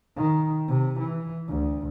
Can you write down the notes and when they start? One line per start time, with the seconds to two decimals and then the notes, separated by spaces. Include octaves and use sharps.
0.17 D#3
0.68 C3
1.00 E3
1.49 D2